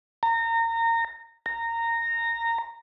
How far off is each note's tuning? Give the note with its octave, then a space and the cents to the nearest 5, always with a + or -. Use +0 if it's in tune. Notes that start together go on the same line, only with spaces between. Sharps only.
A#5 -25
A#5 -15